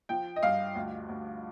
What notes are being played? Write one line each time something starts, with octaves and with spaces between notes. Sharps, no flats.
F3 G5
D#5
G2 F5
D2
D2